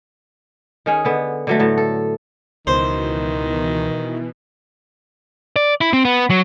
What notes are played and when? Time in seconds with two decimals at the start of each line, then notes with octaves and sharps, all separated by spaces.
0.86 D#3 C#4 G#4
1.05 D3 B3
1.47 D3 F#3 A3
1.59 A2 F#3
1.77 A4
2.67 C#2 B2 D#3 E3 C5
5.56 D5
5.81 E4
5.93 C4
6.05 B3
6.30 F#3